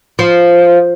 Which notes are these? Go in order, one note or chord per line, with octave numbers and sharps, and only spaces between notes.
F3